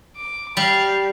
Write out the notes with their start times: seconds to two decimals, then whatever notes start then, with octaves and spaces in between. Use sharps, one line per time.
0.16 D6
0.57 G3 F5